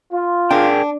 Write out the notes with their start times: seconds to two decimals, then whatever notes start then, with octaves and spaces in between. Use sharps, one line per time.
0.12 F4
0.50 D4 G#4 A#4 G5